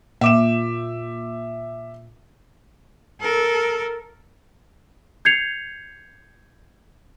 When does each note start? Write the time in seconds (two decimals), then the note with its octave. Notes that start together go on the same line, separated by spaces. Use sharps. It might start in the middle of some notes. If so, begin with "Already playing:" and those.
0.21 A#2 E5 D6 E7
3.20 A4 A#4
5.25 G6 G#6 C7 C#7 F7